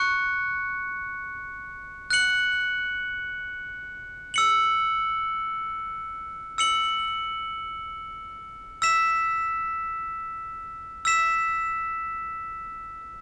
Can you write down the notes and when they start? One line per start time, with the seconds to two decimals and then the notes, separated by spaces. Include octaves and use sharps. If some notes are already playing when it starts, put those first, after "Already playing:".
Already playing: C#6 F#6 C#7
2.10 F#6 C#7 F#7
4.34 E6 C#7 F#7
6.58 E6 C#7 F#7
8.82 E6 B6 E7
11.05 E6 B6 E7